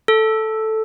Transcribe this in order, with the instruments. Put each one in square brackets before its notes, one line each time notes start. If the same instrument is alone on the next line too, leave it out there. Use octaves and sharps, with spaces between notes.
[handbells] A4